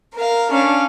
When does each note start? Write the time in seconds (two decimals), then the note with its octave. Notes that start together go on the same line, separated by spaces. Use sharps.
0.15 A#4 F5
0.51 C#4 D4 F5